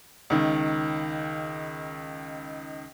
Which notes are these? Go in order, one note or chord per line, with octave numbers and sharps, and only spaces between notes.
C#2 D#3